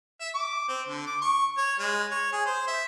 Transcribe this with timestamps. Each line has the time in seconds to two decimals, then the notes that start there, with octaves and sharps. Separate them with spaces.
0.21 E5
0.35 D6
0.69 C4
0.88 D3
1.07 D6
1.21 C#6
1.58 C#5
1.79 G#3
2.11 C#5
2.33 G#4
2.46 C5
2.68 E5